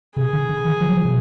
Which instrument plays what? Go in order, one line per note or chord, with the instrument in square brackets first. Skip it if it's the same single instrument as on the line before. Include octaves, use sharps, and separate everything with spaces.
[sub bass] C3 [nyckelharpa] G#4
[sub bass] D3
D3
D#3
F3
F#3
F3
B2